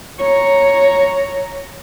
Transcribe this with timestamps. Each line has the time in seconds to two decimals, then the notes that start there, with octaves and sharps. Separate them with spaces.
0.19 C#5 A#5